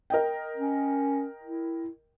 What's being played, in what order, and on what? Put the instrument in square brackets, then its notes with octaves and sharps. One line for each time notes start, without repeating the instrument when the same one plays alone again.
[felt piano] A#4 D#5 G5
[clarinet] C#4
E4